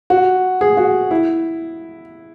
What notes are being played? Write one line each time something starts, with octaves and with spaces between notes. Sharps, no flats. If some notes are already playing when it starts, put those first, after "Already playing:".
F#4
G#4
F#4
E4